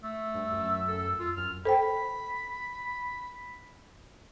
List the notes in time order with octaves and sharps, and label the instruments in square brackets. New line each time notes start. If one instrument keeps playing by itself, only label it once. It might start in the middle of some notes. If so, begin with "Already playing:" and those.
[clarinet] A3 [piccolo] E6
[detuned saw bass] G2
F#2
[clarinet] A4
F4
[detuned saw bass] F#2 [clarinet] F6
[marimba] A4 C5 G5 [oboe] B5